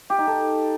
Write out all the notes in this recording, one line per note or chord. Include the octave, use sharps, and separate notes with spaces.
G4
D#4
A4